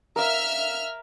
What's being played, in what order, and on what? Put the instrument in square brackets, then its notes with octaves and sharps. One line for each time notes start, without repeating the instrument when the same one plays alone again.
[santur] A#4 F5 [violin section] E5 F6